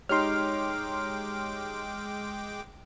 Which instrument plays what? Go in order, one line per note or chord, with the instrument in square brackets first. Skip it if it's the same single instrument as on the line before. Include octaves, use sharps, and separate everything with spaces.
[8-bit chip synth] G#3 G5 D6 [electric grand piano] D#4 G4 C#5 [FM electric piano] C6 F6